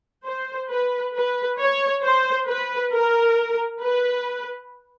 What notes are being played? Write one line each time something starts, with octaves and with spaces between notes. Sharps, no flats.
C5
B4
B4
C#5
C5
B4
A#4
B4